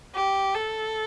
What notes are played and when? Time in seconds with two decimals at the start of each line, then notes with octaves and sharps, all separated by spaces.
0.15 G4
0.55 A4